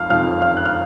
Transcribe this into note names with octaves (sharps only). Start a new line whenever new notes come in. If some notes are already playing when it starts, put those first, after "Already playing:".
Already playing: F2 F5 F6
F2 F3 F5 F6
F5 F6
F#6
F6